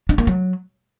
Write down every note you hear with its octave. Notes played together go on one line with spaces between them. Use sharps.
D4
A#3
F#3